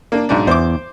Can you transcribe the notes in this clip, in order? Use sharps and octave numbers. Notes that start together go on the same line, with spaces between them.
A#3 D4
B1 G#2 D4
E2 C5 D6